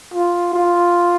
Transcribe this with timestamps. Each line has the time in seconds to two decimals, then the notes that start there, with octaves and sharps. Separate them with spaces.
0.14 F4
0.54 F4